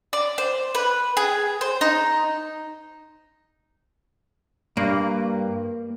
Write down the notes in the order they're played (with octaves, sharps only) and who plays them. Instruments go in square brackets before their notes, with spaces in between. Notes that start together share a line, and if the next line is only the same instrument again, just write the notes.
[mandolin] D5
C5
B4
G#4
C5
D#4
[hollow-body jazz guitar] G2 [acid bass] A#3